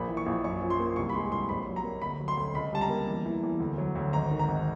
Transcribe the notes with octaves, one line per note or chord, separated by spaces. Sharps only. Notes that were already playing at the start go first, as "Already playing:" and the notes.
Already playing: A#1 A#3 B5
E3
C#6
A#1
F#2 C#6
F3
C6
A#3
C2 C#6
B5
G#3 C6
C2 C6
A#1 B5
F#3
A#5
A#3
D2 B5
F#3
C6
D2
C#2 B5
G3 A5
A#5
A#3
E2
E3
E2
D2
F#3
D2
G#1 A#5
D#3
A#5
G#1